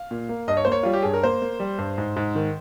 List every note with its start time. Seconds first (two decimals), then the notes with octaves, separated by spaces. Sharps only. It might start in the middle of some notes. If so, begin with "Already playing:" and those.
Already playing: F5
0.11 A#2
0.29 A#3
0.48 G2 D#5
0.57 C#5
0.65 A#3 C5
0.72 C#5
0.83 G3 F4
0.93 G4
1.03 G2 G#4
1.13 A#4
1.23 A#3 C5
1.42 A#3
1.60 G3
1.78 G2
1.98 G#2
2.16 G#2
2.35 D#3